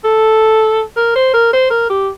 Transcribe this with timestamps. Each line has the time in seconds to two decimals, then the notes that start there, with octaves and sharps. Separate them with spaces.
0.04 A4
0.96 A#4
1.15 C5
1.34 A#4
1.53 C5
1.71 A#4
1.90 G4